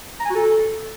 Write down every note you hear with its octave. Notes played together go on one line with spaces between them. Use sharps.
A#5
G#5
F#4
A4